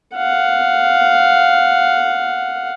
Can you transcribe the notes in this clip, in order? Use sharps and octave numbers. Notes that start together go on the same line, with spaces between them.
F5 F#5